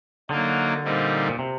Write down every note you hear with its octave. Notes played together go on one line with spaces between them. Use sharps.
D3 F#3 A#3 D#4
A#2 G3 C4 D#4
A#2
C3